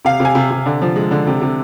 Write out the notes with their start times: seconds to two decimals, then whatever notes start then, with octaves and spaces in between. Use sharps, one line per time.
0.05 C3 F5
0.20 C3
0.25 G#5
0.35 C3
0.50 C3
0.66 D3
0.81 F3
0.96 G#3
1.11 D3
1.27 C3
1.41 C3